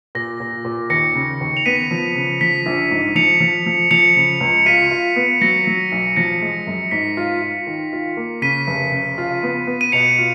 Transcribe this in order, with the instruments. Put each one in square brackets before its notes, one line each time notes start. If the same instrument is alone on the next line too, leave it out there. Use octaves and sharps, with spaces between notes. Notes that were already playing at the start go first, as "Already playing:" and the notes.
[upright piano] A#2 [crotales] A#6
[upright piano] A#2
A#2
[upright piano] D#2 [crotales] A#6 C#7
[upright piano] C#3
D#2
[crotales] F7
[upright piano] B3 [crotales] B6 D#7
[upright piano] F3
C#3
[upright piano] F3 [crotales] B6
[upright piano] A#1
G#2
[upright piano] F3 [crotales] C#7 F7
[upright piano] F3
F3
[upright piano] F3 [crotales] C#7 F7
[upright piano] C#3
C#2
[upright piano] F4 [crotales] B6 D#7
[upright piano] F4
B3
[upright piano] F#3 [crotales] A#6 C#7
[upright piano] F#3
B1
[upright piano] F3 [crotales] A#6 C#7
[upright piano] G#3
F#2
[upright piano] G#2 [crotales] B6
[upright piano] F4
F4
D#3
F4
A#3
[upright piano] C#3 [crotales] B6 D#7
[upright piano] F1
C#3
F4
B3
B3
[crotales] D#7
[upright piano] B2 [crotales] C#7 F7
[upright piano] F4